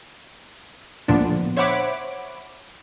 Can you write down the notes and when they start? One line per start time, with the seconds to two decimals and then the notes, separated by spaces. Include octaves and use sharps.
1.08 D2 A#2 F3 B3 D4
1.56 C5 C#5 E5 F#5 B5 D6